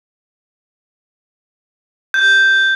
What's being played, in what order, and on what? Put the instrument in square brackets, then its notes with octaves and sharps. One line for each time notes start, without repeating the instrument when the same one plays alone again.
[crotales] G6